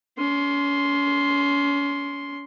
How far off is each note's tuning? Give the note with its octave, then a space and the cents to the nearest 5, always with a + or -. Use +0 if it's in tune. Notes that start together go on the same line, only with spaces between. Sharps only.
C#4 +35 C6 +0